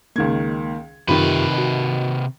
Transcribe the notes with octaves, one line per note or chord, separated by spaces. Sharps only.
C#2 D#3 A#3 G#6
F#2 C3 D#3 F4 G4 B4 B5
F#4 D#5